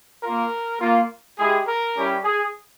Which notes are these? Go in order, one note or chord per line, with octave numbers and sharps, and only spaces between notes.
A#3 F4 A#4
A#3 F4
G#3 E4 G4 G#4
A#4
G3 C#4 E4 G4
G#4